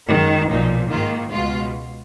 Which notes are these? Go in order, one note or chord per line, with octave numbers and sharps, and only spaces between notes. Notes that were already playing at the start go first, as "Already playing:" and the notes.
F#2 D#3 G#3
B1 A#2 F3 D#4
G#2 D#3 A#3 F4
C#2 B2 G#3 F4